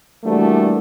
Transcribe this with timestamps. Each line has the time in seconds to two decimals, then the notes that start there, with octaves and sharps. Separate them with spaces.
0.24 E3 G3 A3 A#3 D4 F#4